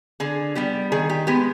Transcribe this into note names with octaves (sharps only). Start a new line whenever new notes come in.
D3 G#4
G3 B3 G4
D#3 G#4
G4
G#3 B3 G4